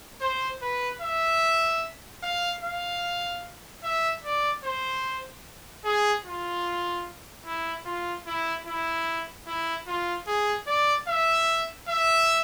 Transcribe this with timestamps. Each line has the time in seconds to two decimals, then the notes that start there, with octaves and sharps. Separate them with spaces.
0.21 C5
0.62 B4
1.01 E5
2.23 F5
2.63 F5
3.83 E5
4.24 D5
4.64 C5
5.84 G#4
6.25 F4
7.46 E4
7.85 F4
8.26 E4
8.67 E4
9.47 E4
9.87 F4
10.27 G#4
10.67 D5
11.08 E5
11.88 E5